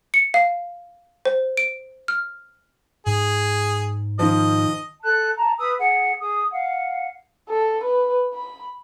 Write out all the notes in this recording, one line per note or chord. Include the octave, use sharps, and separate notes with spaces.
C#7
F5
C5
D7
F6
G#2 G#4
D#3 F3 D#5
A4 A5 F#6
A5 A#5
B4 D#6 E6
G#4 F#5
G#4 D#6
F5 F#5
A4
B4
B5